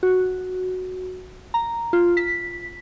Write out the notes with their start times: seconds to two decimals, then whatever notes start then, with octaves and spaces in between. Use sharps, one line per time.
0.03 F#4
1.54 A#5
1.93 F4
2.17 B6